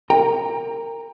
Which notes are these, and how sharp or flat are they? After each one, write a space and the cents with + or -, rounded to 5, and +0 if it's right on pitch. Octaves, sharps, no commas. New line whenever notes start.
A#4 -20 G5 +30 A#5 +0